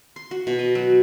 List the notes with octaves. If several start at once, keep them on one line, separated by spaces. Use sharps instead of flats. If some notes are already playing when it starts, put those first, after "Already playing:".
C6
F#4
B2
D#5
F#3